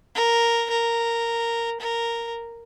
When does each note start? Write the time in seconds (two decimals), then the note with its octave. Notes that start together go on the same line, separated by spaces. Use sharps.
0.15 A#4
0.70 A#4
1.80 A#4